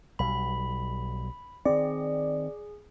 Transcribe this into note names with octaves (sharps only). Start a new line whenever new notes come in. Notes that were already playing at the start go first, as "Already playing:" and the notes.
B1 G3 B5
D#3 C4 G#4 D5